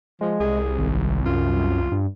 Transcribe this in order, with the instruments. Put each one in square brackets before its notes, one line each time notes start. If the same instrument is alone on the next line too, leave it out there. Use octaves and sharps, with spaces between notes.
[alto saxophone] F3 [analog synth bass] G#3
[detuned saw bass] C2 [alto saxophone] G#4
[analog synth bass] G#1
[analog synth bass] F#2 [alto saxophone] F4
[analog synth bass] G2